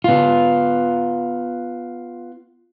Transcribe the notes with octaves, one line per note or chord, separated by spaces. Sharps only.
B3 F4